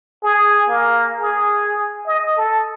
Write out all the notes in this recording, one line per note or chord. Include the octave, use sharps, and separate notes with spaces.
G#4
A#3
G#4
D#5
A4